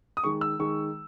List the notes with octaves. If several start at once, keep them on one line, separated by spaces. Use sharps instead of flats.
D#6
D#3 G#3 C#6
E6
D#3 G#3 C#6